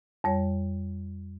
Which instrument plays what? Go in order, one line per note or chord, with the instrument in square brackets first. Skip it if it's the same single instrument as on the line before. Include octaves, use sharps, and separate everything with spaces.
[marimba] F2 G3 C#5